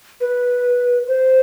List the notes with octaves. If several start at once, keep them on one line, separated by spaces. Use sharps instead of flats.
B4
C5